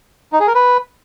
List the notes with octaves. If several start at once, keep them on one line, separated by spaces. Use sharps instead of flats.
D#4
G#4
A#4
B4